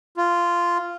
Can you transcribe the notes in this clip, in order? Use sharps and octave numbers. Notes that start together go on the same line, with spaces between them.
F4